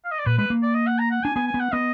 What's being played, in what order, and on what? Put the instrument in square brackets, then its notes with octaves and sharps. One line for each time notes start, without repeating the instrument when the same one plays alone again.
[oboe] F5
D#5
D5
[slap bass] A#2 [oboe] B4
[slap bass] G#3 [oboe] B4
[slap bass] A#3
[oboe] D5
D#5
F#5
A#5
F#5
[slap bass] D4 [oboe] G#5
[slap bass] B3 [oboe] G#5
[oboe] G#5
[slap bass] B3
[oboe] F#5
[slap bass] B3 [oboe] D#5